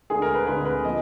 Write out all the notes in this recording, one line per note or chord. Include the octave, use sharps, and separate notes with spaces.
D2 D3 G#3 G#4
A#4
B4
D2 D3 G#3 B4
B4
F3 A#3 D#5